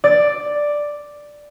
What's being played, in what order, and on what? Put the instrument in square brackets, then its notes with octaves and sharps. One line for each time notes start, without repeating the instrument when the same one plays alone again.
[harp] D5